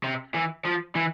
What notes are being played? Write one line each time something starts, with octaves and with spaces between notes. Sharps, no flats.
C3
E3
F3
E3